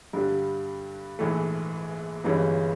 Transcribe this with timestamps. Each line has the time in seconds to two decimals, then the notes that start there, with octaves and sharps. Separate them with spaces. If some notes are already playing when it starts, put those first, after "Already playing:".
0.13 G2 D3 G3
1.19 A#1 G#2 E3 A3
2.24 G1 G2 E3 G#3 C#4